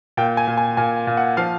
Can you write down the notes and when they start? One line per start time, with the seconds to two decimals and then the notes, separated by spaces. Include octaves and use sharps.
0.17 A#2 G5
0.37 G#5
0.48 A#2
0.57 G#5
0.77 A#2 G#5
1.07 A#2
1.17 F#5
1.37 F3 F5